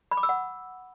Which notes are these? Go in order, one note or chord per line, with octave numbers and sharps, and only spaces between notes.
B5
D6
E6
F#5